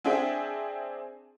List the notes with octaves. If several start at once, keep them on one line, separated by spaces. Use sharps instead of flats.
C4 D4 G#4 E5 G5